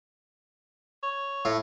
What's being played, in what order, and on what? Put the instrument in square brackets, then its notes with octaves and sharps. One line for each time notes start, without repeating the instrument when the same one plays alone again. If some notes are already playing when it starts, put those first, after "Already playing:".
[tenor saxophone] C#5
[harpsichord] A2